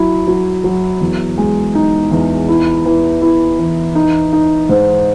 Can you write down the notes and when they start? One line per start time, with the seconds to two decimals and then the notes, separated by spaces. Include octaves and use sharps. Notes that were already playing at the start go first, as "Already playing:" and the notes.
Already playing: F#3 E4
0.27 F#3
0.64 F#3
1.01 E2
1.38 G#3
1.75 D#4
2.11 E2
2.49 E4
2.86 E3
3.22 E4
3.59 E3
3.95 D#4
4.33 D#4
4.69 G#2